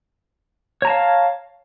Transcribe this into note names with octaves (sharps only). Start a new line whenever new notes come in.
C#5 F5 A5 A#5